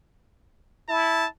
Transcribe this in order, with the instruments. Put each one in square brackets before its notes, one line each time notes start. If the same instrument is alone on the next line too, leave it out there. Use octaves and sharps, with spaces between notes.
[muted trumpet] E4 [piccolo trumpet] A5